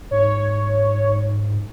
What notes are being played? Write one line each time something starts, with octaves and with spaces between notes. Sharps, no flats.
G#2 C#5